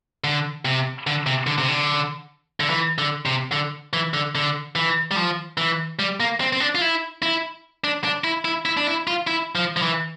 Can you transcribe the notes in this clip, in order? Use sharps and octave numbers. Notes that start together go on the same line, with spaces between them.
D3
C3
D3
C3
D3
C3
D3
D3
E3
D3
C3
D3
E3
D3
D3
E3
G3
F3
E3
G3
A#3
C4
C4
D4
F4
E4
E4
D4
D4
E4
E4
E4
D4
E4
F4
E4
F3
F3
E3